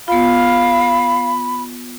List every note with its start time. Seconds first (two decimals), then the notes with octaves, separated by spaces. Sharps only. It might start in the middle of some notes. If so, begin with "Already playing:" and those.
0.08 B3 F4 F5 B5